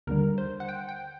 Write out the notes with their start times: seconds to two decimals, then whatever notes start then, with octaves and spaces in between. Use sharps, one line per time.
0.07 D#2 D3 G3 A#4
0.38 C5
0.60 F#5
0.69 G5
0.89 G5